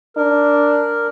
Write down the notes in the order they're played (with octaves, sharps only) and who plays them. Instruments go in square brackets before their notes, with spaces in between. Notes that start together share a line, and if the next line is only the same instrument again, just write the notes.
[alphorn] D4 [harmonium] A#4